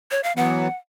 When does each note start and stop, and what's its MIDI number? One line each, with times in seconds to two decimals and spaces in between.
0.11 0.21 73
0.24 0.32 77
0.37 0.68 52
0.37 0.68 54
0.37 0.68 59
0.37 0.76 78